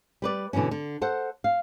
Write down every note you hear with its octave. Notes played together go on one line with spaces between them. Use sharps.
G3 B4 D5
B2 D3 E3 F#3 C#4
D3
A4 C5 F#5
F5